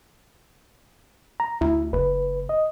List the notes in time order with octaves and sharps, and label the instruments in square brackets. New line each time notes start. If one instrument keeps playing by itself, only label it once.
[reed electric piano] A#5
[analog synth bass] D2 [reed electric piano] E4
[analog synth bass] F#1 [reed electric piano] B4
[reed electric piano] D#5